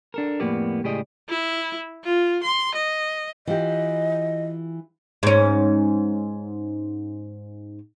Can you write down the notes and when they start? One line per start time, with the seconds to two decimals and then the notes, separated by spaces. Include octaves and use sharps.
0.14 D4 A4 A#4
0.40 F2 A2 A#3 B3 G4 D5
0.84 C#2 A2 G4 G#4 D5 D#5
1.29 E4
2.04 F4
2.43 C6
2.75 D#5
3.47 E3 F4 G4 D#5
5.23 G#2 C#4